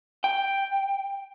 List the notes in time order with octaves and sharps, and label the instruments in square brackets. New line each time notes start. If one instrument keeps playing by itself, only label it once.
[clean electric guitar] G5